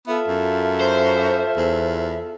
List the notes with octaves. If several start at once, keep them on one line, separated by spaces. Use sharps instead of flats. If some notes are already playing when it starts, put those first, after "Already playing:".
B3 F4 A4 E5
F#2
C5
E2